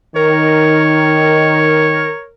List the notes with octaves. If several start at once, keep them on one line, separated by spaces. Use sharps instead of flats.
D#3 A#4 C#5